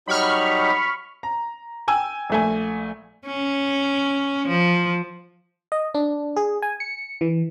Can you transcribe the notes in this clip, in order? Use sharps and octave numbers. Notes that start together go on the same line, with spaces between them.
F#3 G3 D#4 B5 C#6 F6
A#5
G5 G#5 E6
A#1 A3 G#5
C#4
F3
D#5
D4
G#4
G#5
C#7
E3